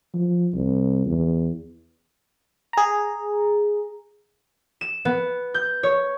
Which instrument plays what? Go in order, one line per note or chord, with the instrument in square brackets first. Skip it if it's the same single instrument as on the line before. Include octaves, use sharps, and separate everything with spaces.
[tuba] F3
C2
E2
[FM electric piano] G#4 A#5
[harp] E7
B3
G6
C#5